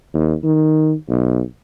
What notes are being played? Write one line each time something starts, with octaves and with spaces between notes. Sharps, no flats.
D#2
D#3
B1